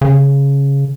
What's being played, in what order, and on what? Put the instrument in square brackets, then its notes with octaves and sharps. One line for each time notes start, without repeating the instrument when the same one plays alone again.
[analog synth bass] C#3